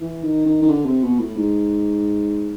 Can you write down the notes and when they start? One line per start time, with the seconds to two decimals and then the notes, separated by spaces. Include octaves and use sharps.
0.01 E3
0.23 D#3
0.46 D#3
0.62 D#3
0.69 D3
0.85 C3
1.03 B2
1.20 A2
1.36 G#2